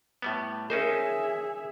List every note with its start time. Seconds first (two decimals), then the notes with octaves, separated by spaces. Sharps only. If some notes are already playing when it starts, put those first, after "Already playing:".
0.22 A2 G3 B3
0.70 C#4 D#4 G#4 A#4 C5 C#5 E5 G#5